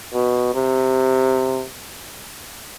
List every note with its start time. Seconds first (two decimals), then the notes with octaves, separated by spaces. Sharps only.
0.13 B2
0.54 C3